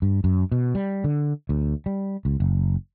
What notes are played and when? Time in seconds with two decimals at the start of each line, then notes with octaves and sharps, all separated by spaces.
0.02 G2
0.24 F#2
0.52 B2
0.75 G3
1.04 D3
1.49 D2
1.86 G3
2.25 C#2
2.40 F#1